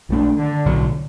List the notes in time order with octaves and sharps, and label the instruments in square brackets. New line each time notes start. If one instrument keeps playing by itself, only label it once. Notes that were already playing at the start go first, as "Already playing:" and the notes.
[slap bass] B1 B2 A3 D4
[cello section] D3
[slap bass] B1 A2 F#3